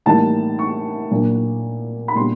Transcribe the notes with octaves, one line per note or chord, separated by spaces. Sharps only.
A2 E3 G3 A#3 D#4 A5
C#6
A#2 F#3 A#3 D4
B5
A#2 G3 B3 D4 C6